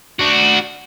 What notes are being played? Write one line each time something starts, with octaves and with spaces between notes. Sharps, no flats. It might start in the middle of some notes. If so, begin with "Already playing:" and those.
D4 F#4